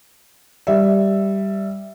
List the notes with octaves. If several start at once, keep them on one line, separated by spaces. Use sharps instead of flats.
G3 E5